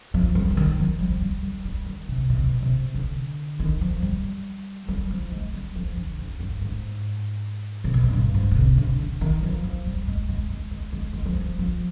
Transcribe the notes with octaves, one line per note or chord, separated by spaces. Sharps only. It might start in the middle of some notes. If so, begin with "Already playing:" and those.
F3
G3
F3
D#3
F3
G3
G3
G3
G3
D#3
C3
B2
C3
B2
C3
D3
D#3
F3
G3
G3
F3
G#3
G3
F3
D3
F2
G2
G#2
C3
B2
G#2
G2
G#2
B2
C3
D3
D3
D#3
F3
F3
G3
G#3
G#3
G#3
G#3
G#3
G#3
F3
G3
F3